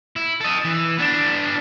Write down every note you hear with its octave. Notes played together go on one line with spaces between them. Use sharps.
E4
A4 D#5
E3
B3 D4